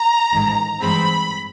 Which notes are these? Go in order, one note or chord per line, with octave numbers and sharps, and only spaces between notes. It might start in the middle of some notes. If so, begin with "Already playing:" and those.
Already playing: A#5
A1 G#2 D#3
G2 E3 G#3 C4 B5